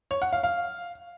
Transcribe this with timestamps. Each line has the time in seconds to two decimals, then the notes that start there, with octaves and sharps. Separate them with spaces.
0.11 C#5
0.22 F#5
0.33 F5
0.43 F5